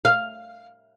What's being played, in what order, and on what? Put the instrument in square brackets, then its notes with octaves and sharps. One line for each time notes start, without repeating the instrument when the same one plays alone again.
[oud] F5